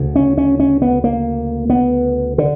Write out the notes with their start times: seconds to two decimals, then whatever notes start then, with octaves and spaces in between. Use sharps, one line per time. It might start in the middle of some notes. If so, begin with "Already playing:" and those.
Already playing: D2 C#3
0.16 C#4
0.38 C#4
0.60 C#4
0.82 B3
1.04 A#3
1.70 B3
2.38 D3